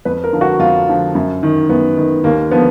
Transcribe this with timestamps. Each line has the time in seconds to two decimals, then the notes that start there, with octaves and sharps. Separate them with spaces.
0.05 F2 B4
0.24 A#4
0.33 D3 F3
0.41 F#4
0.59 F2 F4
0.88 D3 F3
1.15 F#2
1.43 D#3
1.69 F#2 B3
1.97 D#3
2.24 D#2 A#3
2.51 D3 F3 B3